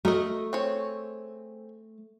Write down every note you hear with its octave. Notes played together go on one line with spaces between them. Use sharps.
A3 F#4 A#4 D#5
C4 G#4 C#5